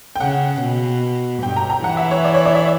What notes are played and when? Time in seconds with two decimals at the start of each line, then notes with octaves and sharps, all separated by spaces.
0.16 G5
0.20 C#3 F#5
0.61 B2
1.43 G2 G5
1.56 A#5
1.70 A#5
1.84 E3 F#5
1.97 E5
2.11 C#5
2.24 D5
2.34 C#5
2.45 D5
2.55 E5